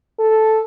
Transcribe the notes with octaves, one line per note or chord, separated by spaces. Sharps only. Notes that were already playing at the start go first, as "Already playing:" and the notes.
A4